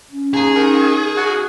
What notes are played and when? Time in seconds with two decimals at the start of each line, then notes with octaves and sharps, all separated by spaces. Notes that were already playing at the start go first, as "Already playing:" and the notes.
0.11 C#4
0.34 D#2 G#4
0.56 D#3
1.17 F#4